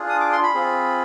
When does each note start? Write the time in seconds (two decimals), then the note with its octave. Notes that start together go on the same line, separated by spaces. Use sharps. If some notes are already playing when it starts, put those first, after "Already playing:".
Already playing: D4 F4 G#4
0.09 D#6
0.20 D6
0.32 C6
0.43 B5
0.54 C4 F4 G#4